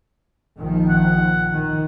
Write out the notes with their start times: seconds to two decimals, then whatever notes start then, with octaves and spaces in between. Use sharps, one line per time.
0.60 A#1 D#3 F3
0.89 F#5
1.53 D#3